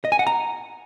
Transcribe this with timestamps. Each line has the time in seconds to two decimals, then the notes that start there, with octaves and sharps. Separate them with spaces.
0.05 D#5
0.12 G#5
0.19 F#5
0.27 A#5